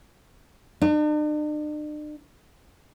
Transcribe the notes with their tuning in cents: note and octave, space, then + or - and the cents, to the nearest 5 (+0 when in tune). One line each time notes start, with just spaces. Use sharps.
D4 +45